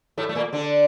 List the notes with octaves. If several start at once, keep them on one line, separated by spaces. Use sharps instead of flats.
A2 A3
A3
A#2 A#3
D3 D4